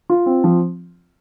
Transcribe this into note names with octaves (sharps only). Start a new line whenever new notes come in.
F4
C4
F3